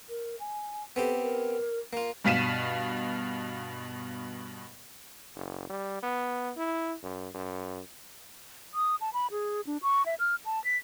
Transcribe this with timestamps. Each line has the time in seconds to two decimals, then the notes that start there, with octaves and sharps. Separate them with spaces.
0.09 A#4
0.40 G#5
0.96 B3 C4 G4 A4
1.22 A#4
1.93 A#3 F4
2.24 G2 B2 F5 B6 D#7 E7
5.35 F#1
5.69 G3
6.03 B3
6.57 E4
7.03 F#2
7.34 F#2
8.74 D#6
9.01 A5
9.13 B5
9.31 G#4
9.67 D4
9.83 C#6
10.06 E5
10.20 F6
10.45 A5
10.64 B6